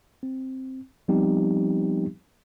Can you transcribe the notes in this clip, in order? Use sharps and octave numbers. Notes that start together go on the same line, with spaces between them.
C4
F3 G3 B3 C4 D#4 G4